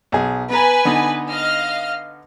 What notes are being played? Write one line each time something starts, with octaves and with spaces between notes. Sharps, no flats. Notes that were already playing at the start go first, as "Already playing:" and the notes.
B1 G#4
B3 B4 G#5 A#5
D3 B3 D#4
D#5 F5 F6